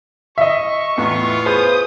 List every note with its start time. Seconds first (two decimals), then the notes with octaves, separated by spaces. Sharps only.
0.38 D#5 E5 C#6
0.98 E2 A2 B3 F4
1.46 G#4 B4 C5 D#6